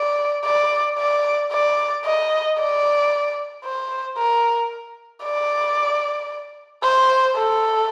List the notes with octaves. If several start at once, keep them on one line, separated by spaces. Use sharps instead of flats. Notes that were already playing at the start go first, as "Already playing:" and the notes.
Already playing: D5
D5
D5
D5
D#5
D5
C5
A#4
D5
C5
A4